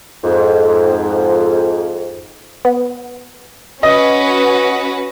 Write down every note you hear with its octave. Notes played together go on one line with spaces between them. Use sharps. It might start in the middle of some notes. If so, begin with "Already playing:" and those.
F2 G#2
B3
C#4 F#4 B4 D#5